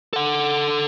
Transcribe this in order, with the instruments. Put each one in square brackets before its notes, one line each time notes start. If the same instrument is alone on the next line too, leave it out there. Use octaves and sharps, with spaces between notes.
[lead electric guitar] A4 F#5